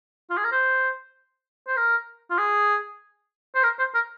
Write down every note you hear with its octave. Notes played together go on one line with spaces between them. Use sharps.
F4
G#4
A#4
C5
C5
A#4
F4
G#4
C5
A#4
C5
A#4